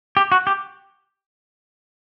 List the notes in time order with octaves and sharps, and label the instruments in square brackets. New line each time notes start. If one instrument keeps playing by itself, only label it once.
[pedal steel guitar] G4
F#4
G4